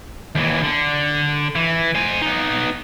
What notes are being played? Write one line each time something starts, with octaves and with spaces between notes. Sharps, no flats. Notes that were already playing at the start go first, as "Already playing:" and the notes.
D#2 E3
D3
E3
C5 G#5
B3 D#4